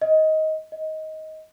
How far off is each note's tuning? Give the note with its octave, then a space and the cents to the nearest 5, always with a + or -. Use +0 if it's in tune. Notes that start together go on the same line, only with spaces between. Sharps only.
D#5 +15
D#5 +15